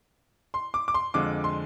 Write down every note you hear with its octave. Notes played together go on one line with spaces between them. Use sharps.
C6
D6
D6
C6
F2 D3 F3 G#3 D6
C6